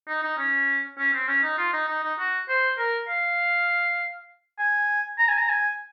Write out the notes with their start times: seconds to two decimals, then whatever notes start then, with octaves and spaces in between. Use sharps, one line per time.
0.08 D#4
0.23 D#4
0.38 C#4
0.98 C#4
1.13 C4
1.28 C#4
1.43 D#4
1.58 F4
1.73 D#4
1.88 D#4
2.03 D#4
2.19 F#4
2.48 C5
2.78 A#4
3.08 F5
4.59 G#5
5.19 A#5
5.29 G#5
5.38 A#5
5.49 G#5